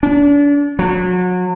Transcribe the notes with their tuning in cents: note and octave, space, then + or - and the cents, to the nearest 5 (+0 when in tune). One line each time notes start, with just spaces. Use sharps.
D4 -35
F#3 -30